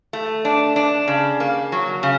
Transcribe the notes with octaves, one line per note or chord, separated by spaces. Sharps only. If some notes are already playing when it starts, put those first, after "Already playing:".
A3
D4
D4
C#3
A#3
F#3
C#3